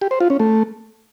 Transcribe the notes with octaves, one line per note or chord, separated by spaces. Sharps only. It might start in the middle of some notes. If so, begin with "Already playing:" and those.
G4
C5
F4
C#4
A3